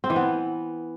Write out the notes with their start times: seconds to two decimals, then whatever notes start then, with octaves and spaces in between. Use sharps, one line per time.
0.04 C4
0.10 E3
0.16 B3